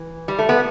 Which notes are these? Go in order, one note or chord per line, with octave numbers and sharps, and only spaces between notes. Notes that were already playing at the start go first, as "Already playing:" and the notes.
Already playing: E3
G3
A3
B3